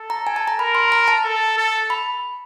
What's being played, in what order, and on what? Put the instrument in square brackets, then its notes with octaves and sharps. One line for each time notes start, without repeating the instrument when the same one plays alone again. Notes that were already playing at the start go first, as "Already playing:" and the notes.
Already playing: [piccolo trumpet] A4
[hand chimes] A#5
G#5
A5
A#5
[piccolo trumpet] A#4 [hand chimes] B5
[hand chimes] C6
A#5
A5
[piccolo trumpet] A4
A4
[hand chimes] B5